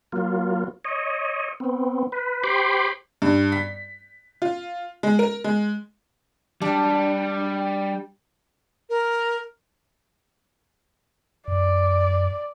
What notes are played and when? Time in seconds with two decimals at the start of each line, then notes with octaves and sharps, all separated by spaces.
0.12 F#3 A#3 F4
0.85 C#5 D#5
1.60 B3 C4
2.12 B4
2.44 G4 C5 B5 C6 D6
3.22 G2
3.52 B6
4.42 F4
5.03 G#3
5.19 A#4
5.44 G#3
6.62 G3 D4
8.89 A#4
11.48 F#2 D5